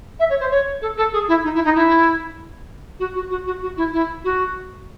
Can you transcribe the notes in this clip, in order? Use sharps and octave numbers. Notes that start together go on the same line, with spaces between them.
E5
C#5
C5
C#5
A4
A4
G#4
E4
D#4
E4
D#4
E4
F#4
F#4
F#4
F#4
F#4
E4
E4
F#4